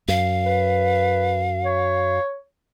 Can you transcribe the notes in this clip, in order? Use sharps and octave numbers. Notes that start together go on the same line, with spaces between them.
F#2 F5
B4
C#5